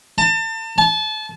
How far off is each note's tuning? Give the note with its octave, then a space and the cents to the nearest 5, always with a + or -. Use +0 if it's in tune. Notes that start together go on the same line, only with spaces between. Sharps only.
A5 +35
A5 -30